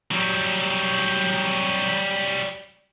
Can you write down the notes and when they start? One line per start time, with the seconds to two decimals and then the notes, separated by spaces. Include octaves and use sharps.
0.11 F#3 G3